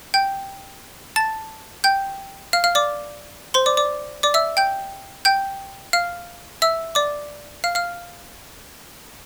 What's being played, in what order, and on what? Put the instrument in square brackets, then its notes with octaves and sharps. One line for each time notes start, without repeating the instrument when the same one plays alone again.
[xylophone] G5 G6
A5 A6
G5 G6
F5 F6
F5 F6
D5 D6
C5 C6
D5 D6
D5 D6
D5 D6
E5 E6
G5 G6
G5 G6
F5 F6
E5 E6
D5 D6
F5 F6
F5 F6